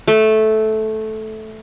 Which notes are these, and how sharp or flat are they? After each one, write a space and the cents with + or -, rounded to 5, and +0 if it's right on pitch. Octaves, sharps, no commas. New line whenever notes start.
A3 -10